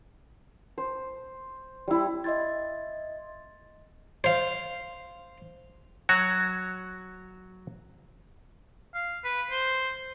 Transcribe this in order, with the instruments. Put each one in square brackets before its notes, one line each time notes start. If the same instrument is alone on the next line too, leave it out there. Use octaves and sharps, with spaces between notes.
[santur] C5
G3 E4
[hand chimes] D#5 E5 C6 G#6 A6
[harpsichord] C5 F5
[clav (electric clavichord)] F#3 F#4 C#5
[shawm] F5
B4
C5